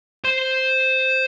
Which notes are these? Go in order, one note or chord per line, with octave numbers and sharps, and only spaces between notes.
C5 C6